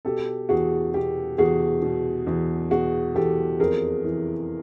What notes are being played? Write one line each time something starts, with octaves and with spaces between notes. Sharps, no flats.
B2 G4 A4
E2 F#4 G#4
B2 G4
E2 F#4 G#4
B2
E2
B2 F#4 G#4
E2 G4 A4
F2 G#4 A#4
E3